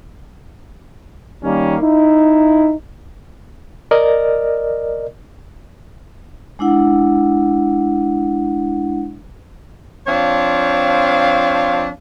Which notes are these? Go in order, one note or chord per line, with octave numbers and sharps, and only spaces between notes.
D#3 G3 A#3 C#4
D#4 E4
A#4 D5 D#5
G#3 D4 E4 F#5
F3 C4 D4 C#5 F5